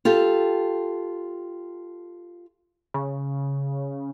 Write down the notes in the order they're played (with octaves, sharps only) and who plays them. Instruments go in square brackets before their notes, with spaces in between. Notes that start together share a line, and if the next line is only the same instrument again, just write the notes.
[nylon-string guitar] F4 G4 A4
[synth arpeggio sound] C#3